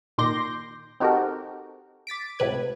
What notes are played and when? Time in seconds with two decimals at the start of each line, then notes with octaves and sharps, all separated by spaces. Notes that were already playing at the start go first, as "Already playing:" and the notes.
0.18 A#2 D#3 C6 D6 G6 A#6
1.00 C4 D#4 F#4 G4 A4 A#4
2.07 D6 A6 B6 D7
2.39 C#2 A2 C3 B4 G#6